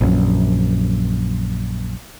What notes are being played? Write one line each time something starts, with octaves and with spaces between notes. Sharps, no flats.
A#1 F#2